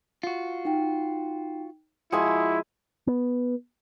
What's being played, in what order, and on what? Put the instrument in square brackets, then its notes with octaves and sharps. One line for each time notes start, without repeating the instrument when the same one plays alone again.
[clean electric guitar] F4 F#4
[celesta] D#4 G5
[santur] F3 G#3 G#5 [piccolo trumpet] E4 [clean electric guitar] F#4 [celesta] D#6
[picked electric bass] B3